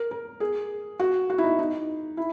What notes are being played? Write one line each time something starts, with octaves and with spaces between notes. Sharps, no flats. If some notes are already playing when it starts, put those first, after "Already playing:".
Already playing: A#4
A#4
G#4
F#4
F#4
E4
D#4
D#4
E4